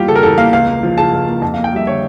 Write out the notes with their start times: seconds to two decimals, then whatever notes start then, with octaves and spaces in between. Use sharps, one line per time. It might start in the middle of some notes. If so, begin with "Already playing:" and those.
Already playing: E2 G3 A#3 F4 G4
0.08 C#3 A4
0.15 A#4
0.23 E2 A4
0.38 A#3 F5
0.53 C#2 F5
0.67 A#3
0.83 F3
0.98 C#3 A5
1.13 C#2
1.27 A#3
1.42 F2 A5
1.54 F5
1.57 A#3
1.64 G5
1.73 G3 E5
1.87 D3 C#5